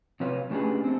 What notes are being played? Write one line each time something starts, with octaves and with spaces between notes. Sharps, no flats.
C3 F#3 B4 F5
C#3 A3 D4 G4 G#4 B4
A3 C4